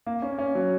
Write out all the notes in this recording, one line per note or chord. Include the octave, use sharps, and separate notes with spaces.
A#3
C#4
C#4
F#3